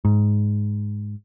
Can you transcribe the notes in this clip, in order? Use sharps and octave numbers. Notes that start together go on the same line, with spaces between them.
G#2